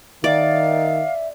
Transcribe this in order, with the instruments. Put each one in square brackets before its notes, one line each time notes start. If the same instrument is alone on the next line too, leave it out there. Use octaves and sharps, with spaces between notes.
[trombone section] D#3 [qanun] D5 [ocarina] E5 [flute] F5